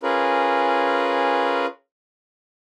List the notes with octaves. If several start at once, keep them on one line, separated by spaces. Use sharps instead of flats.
C#4 F4 G#4 A#4 B4